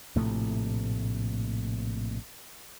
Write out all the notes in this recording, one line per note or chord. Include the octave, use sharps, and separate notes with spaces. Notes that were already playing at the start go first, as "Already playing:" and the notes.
A#1 A2 C3 A3